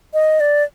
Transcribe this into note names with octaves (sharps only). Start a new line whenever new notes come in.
D#5
D5